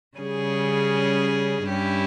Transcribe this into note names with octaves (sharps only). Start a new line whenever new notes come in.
C#3 G3 C#4 G#4
G2 G3 C#4 E4 G4